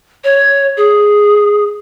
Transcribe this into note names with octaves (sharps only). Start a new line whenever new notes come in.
C#5
G#4